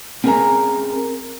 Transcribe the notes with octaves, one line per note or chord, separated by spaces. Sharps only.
C4 C#4 G#4 A#4 G#5 A#5